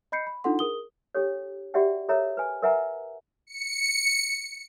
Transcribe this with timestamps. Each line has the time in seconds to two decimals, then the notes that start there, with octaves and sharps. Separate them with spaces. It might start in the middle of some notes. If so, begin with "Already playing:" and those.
0.12 D#5 B5 G6 C7 C#7
0.27 B5
0.44 D4 D#4 F4 A4 F#5 C6
0.59 G#4 A#4 D#6 G7
1.15 D4 G4 A4 C#5
1.74 F#4 G4 D5 E5 F#5 G5
2.09 A4 A#4 C#5 E5 A#5
2.37 B4 G#5
2.62 A#4 B4 E5 F#5 G#5 A#5
3.47 C#7